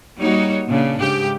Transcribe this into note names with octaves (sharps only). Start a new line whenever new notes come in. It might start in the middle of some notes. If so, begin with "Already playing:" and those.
G3 A#3 D#4 F#4 C#5
A#2 C#3 D4
G#2 C#3 G4